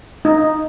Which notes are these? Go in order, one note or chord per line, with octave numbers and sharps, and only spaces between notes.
D#4